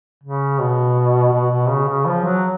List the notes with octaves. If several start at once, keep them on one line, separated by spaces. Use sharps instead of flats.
C#3
B2
B2
B2
C#3
C#3
F3
F#3